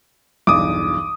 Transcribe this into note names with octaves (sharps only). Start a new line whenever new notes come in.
B1 E2 G2 D6 D#6